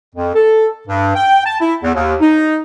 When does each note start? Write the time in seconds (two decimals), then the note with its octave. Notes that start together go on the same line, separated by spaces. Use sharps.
0.15 F2
0.35 A4
0.88 G2
1.15 G5
1.45 A5
1.61 E4
1.83 E2
1.95 D#2
2.21 D#4